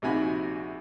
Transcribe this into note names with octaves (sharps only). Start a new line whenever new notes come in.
A#1 C3 D#4 F#4 G#5 B5